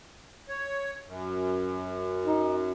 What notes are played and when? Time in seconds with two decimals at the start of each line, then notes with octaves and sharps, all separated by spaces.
0.49 C#5
1.05 F#2
2.25 D#4